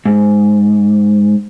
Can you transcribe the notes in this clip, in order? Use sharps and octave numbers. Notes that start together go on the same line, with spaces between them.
G#2